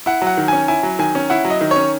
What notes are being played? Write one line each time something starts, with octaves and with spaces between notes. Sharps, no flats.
E4 F#5
F#3
F#5
D#3
C#4 G#5
E4 G#5
F#3
D#3 G#5
C#4
E4 F#5
F#3
D#5
D#3
C#5
C#4